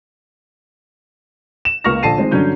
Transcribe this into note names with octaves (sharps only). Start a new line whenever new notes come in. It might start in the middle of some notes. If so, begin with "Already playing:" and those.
E7
C#2 A#3 F5 C#6 F6 A#6
A#1 D3 A4 A5 C7 D#7
D#3 G#3 C4
G2 D3 F#3 C#4 G6